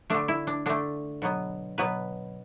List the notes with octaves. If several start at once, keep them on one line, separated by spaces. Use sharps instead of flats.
D3 A3 D4
E4
D4
D3 A3 D4
B2 F#3 B3
B2 F#3 B3 B4